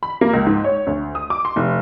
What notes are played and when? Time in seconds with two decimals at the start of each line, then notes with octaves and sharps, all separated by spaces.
0.03 B5
0.21 A#3
0.33 C#2
0.46 G#2
0.64 C#5
0.87 D2
1.15 D#6
1.30 D6
1.45 C6
1.56 F1